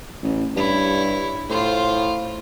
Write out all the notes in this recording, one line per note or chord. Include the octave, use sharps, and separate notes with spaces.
A1
G2 E4 C#5
A2 F4 C5